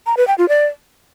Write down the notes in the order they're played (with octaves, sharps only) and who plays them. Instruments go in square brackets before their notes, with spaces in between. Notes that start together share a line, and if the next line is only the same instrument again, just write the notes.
[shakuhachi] A#5
B4
G5
F4
D5